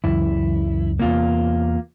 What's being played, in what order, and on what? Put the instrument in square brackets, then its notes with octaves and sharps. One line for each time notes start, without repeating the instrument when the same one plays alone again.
[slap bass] C#2 F#2 E3 [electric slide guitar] E4
[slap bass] E2 C3 [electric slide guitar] A#3 F4